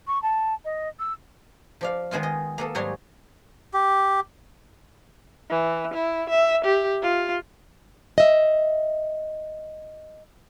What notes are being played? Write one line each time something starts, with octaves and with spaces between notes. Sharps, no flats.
C#6
A5
D#5
E6
F3 D5 F5
D#3 G#3 B3 F4
D#5
A#3 B3 A4
G#2 F#3 G3 D#4 C#5 C6
G4
E3
E4
E5
G4
F4
D#5 E5